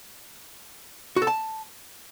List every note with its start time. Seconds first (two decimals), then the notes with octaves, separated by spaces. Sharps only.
1.16 F#4
1.22 A4
1.27 A5